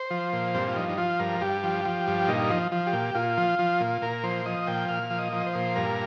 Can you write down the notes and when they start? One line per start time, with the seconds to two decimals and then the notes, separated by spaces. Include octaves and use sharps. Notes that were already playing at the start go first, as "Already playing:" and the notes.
Already playing: C5
0.11 F3
0.33 A#2
0.54 G2 C4
0.68 F4
0.76 F3 D#4
0.89 D#4
0.98 F3 F4
1.19 G2 A#4
1.41 G2 G4
1.63 F3
1.85 F3
2.07 G2
2.28 A#2 D#4
2.50 F3
2.72 F3
2.87 G4
2.93 A#2
3.15 A#2 F4
3.37 F3
3.59 F3
3.81 A#2
4.02 A#2 A#4
4.23 F3 C5
4.46 F3 D#5
4.67 A#2 G5
4.89 A#2 F5
5.10 F3
5.18 D#5
5.32 F3
5.47 C5
5.55 A#2
5.75 G2 A#4